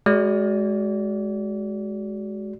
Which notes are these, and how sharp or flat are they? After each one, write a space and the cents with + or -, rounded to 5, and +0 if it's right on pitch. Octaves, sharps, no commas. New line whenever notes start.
G#3 +20 F#4 +25 D5 -30